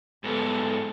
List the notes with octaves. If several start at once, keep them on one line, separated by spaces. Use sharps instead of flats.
G#2 B3 A4